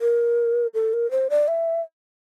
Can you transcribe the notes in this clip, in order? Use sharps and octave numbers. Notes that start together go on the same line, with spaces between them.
A#4
A4
A#4
C5
D5
E5